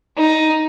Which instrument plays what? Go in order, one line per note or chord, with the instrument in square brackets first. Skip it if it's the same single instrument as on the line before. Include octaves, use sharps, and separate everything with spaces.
[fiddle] D#4